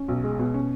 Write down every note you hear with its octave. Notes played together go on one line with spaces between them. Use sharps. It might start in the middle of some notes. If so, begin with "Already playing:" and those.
Already playing: C#4
B1
G#3
B2
C#4